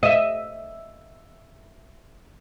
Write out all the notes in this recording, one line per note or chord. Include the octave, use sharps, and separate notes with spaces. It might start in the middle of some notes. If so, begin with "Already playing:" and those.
D#5 E5